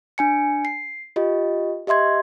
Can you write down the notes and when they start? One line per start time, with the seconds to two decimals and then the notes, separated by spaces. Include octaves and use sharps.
0.18 D4 G#5 C#7
0.65 C7
1.16 F4 G4 D#5
1.87 G4 D#5 E5 C6 G#6